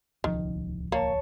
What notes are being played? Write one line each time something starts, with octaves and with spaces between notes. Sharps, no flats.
D1 C2 D#3 F3
A#3 C#5 A5